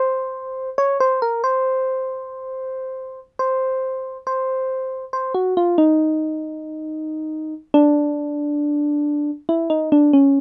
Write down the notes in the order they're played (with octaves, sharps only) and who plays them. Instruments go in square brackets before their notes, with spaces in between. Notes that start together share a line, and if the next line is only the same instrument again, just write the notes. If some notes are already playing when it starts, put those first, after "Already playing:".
Already playing: [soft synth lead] C5
C#5
C5
A#4
C5
C5
C5
C5
F#4
F4
D#4
D4
E4
D#4
D4
C#4